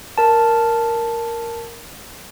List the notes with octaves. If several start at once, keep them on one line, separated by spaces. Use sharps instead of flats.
A#4 A5